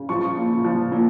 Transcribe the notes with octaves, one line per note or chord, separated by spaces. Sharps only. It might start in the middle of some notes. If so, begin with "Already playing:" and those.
Already playing: C#3
F3 C#6
A#2
F3
A#2